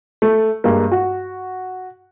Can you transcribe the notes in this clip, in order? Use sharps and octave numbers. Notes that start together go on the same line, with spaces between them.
A3
G2 G#3 A#3
F#4